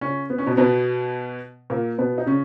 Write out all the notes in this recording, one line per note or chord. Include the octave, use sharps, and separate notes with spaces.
C#3 C#4
B3
C#4
B2 B3
B2 B3
A#2 A#3
B2 B3
D#4
C#3 C#4